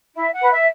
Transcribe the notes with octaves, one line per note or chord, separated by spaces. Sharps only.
E4 E5
F#5
B4
E5